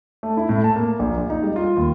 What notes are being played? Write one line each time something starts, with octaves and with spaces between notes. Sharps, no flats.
A3
E4
A2
A5
A#3
A#1
A#1
D#4
G3
F4
D#2